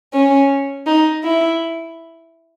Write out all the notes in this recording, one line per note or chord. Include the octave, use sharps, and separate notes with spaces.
C#4
D#4
E4